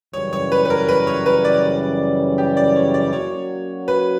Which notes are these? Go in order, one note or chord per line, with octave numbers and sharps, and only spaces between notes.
F#2 C#3 E3 G3 C#4 C#5
C#5
B4
B4
A#4
B4
C#5
B4
D5
G4
D5
C#5
D5
F#3 A#3 C#4 F#4 C#5
B4